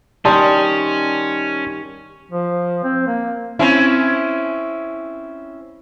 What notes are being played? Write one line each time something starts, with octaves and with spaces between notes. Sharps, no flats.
D#3 G3 C#4 A5 C6
F3
C4
A#3
C4 C#4 E4